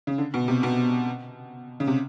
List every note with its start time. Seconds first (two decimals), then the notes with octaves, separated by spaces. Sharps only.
0.07 C#3
0.18 D3
0.34 B2
0.48 C3
0.63 B2
1.80 C#3
1.87 C3